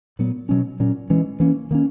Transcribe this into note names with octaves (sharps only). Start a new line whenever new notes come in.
A#2 F#3 B3
B2 F#3 C#4
A#2 F#3 C#4
E3 G#3 C#4
E3 A#3 C#4
D#3 A#3 C#4